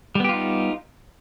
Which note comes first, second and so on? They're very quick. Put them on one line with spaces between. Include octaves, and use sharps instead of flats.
G3 B3 G4 F4 D#4